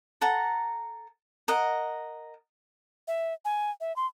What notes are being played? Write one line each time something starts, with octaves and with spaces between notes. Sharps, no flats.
A4 F#5 A#5
A#4 D#5 F#5
E5
G#5
E5
C6